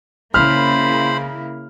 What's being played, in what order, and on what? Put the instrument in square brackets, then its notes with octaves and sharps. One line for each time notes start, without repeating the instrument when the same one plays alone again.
[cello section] C#3 A#3 E4 [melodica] C5 B5 [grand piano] F6